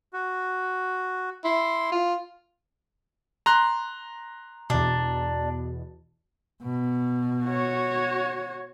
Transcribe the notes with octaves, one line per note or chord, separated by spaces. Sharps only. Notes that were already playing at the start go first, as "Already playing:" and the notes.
F#4
E4 C6
F4
A#5 C6 F#6
E2 B2 D4
B2
F#4 C#5